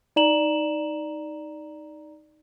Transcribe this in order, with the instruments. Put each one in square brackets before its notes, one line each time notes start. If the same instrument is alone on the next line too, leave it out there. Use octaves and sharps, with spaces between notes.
[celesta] D#4 D5 A#5 E7 F#7